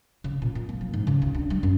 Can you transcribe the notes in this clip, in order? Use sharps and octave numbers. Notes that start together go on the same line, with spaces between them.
C#3
A#2
A#2
A#3
F3
G#2
C#3
D2
D4
G3
F#2